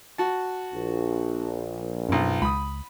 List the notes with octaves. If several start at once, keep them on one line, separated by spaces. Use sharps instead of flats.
F#4 A5
A#1
B1 F#2 F3
C#2 B5 D#6